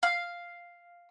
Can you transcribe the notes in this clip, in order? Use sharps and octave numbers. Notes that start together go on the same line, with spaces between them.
F5